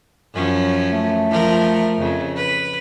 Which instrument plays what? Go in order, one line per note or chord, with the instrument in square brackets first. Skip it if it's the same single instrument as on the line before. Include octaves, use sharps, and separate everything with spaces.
[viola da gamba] F#2 F3 C#4
[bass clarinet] A3
[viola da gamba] F3 A#4
F2 C#3
B4